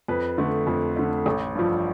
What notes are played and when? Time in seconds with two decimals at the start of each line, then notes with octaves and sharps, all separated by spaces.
0.08 F2 B4
0.38 D3 A3
0.67 F2
0.96 D3 A3
1.26 A1
1.55 G2 F3